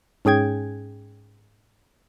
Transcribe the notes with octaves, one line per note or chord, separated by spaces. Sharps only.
G#2 C#4 G#4 G5 G#6